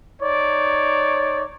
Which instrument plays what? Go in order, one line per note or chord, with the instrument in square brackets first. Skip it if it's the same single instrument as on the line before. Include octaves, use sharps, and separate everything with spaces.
[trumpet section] D#4 C#5 D5